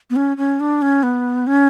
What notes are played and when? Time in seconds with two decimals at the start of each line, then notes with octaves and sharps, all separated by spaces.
0.10 B3
0.16 C#4
0.37 C#4
0.60 D4
0.82 C#4
1.03 B3
1.47 C#4